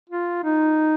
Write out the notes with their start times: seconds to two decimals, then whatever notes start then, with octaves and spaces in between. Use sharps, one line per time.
0.09 F4
0.43 D#4